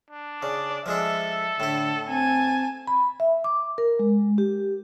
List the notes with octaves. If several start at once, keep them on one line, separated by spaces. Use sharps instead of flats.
D4
C#3 D5
F3 G#3 D4 A4 E5
A2 D3 E4
C4 G#5 A5
B5
E5
D6
A#4
G#3
G4